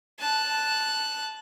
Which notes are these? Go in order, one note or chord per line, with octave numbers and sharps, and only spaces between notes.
A5 F#6